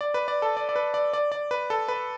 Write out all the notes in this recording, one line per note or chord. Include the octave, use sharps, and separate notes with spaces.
D5
B4
D5
A4
D5
D5
B4
D5
D5
D5
B4
A4
B4